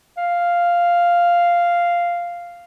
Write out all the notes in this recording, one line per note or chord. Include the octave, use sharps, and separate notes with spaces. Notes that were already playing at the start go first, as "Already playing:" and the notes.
F5